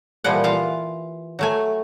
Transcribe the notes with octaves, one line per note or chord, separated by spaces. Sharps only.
A#2 E3 F3 G3 F#5
E3 F4 F5
F#3 A3 G#5